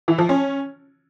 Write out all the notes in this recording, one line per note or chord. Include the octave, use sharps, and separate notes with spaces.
E3
F3
C#4